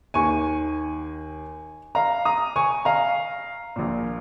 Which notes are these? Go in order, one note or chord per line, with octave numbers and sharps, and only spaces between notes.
D#2 D#3 G#5 C#6
F5 A#5
A#5 D#6
G#5 C#6
F5 A#5
A#1 A#2